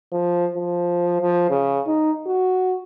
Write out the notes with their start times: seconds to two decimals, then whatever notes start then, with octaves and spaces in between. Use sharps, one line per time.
0.12 F3
0.55 F3
1.21 F3
1.50 C#3
1.87 D#4
2.27 F#4